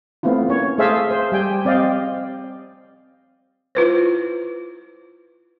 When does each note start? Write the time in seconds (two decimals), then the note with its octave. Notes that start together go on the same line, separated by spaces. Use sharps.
0.23 A3 B3 C4 E4 F4
0.49 A#3 B3 C#4 C#5
0.78 A3 G#4 C5 E5 F5 A5
1.11 C5
1.32 G3 G4 D5 G5 G#5
1.65 C4 D5 D#5 F5 G5
3.75 E4 F4 B4 C5